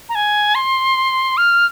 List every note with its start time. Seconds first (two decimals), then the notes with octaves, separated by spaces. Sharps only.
0.09 A#5
0.15 G#5
0.55 C6
1.37 F6